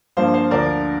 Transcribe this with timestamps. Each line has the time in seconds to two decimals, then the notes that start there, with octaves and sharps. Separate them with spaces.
0.17 G2 F3 A#3 C5 F5
0.34 C5 F5
0.51 D2 D3 F3 A#4 D5